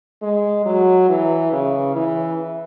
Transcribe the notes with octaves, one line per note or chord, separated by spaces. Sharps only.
G#3
F#3
E3
C#3
E3